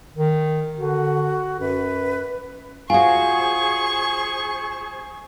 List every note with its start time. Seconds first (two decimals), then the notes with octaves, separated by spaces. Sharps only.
0.17 D#3
0.77 D3 F#4
1.60 F#2 B4
2.90 F4 F#4 G#4 C5 G#5 C#6